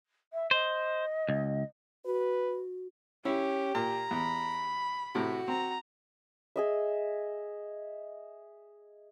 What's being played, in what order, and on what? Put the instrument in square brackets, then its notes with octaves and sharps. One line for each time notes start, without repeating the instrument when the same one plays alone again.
[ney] E5
[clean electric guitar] C5 [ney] D#5
[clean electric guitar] C#2
[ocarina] F#4 [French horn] B4
[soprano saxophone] C#4 [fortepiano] E4 [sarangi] G4
[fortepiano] A#2 [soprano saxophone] A#5
[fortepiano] E2 [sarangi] B5
[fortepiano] A2 C3 [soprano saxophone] F#4
[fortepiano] C4 [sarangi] A#5
[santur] G#4 D#5 E5